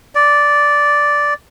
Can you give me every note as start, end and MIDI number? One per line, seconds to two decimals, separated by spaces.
0.15 1.34 74